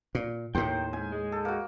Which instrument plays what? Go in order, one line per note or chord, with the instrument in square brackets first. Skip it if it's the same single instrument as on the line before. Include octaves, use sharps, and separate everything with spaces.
[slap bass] A#2
[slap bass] D#2 A2 [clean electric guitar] A#4 G5 [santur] C5
[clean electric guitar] E2 G#2 [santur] G#5
[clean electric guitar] G#3
[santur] A4
A#3 F#4